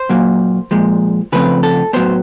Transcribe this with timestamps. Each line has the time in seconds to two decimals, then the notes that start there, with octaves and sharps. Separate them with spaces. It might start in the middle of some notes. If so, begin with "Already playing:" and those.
Already playing: C5
0.09 A#2 F#3 A#3
0.71 A#2 F3 G#3
1.32 C#3 F3 A3 C4 B4
1.63 A4
1.93 A2 F#3 B3 C5